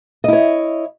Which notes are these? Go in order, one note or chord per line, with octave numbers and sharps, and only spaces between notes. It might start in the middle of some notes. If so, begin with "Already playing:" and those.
E4 C#5 D#5